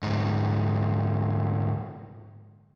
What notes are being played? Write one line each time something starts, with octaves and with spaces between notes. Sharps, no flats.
D2 G#2